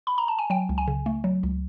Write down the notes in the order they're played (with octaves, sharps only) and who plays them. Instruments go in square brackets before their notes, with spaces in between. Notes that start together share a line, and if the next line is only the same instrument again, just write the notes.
[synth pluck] B5
A#5
A5
G#5
F#3 G5
C#2
G#5
C#3
A3
F#3
C#2